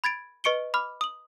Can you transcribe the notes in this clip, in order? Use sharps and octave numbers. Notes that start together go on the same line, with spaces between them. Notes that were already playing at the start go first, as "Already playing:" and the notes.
B5 G#6 A6 D7
B4 D#5 C#6 C#7 D7 G7
B5 D6 F6
D#6 F#7